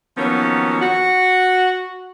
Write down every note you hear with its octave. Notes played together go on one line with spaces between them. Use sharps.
D#3 F3 F#3 A#3 B3 C#4
F#4